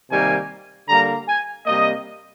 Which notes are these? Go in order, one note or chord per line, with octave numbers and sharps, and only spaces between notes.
C3 D#3 G3 A#3 G#5
D3 G3 A#3 A#5
G#5
C3 G3 A#3 D#5